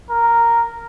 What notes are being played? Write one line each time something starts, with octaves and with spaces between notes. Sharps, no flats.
A#4